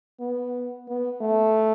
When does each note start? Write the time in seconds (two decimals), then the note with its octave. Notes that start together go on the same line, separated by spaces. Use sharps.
0.20 B3
0.88 B3
1.21 A3